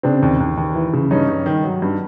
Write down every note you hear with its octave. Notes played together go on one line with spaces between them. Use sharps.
C#3 C4 D4
D#2
D#2
D#2
E3
C#3
G2 C#4 D#4
G2
D#3
F#3
G2